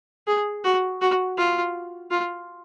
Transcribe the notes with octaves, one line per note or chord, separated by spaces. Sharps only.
G#4
F#4
F#4
F4
F4